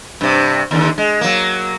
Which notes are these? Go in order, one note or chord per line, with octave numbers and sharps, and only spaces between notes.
G2 C3
D#2 D3
G#3
F#3 A#3